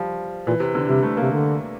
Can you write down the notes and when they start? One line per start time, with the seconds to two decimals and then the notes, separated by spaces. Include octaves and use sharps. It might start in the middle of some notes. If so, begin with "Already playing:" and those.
Already playing: F3 G3
0.47 A#2 E3
0.60 C3
0.75 D3
0.88 C3 G3
1.03 A3
1.17 C3 A#3
1.31 D3